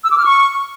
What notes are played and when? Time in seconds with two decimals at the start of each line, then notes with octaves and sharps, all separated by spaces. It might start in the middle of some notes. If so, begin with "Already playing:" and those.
0.04 E6
0.10 D6
0.17 F6
0.24 C#6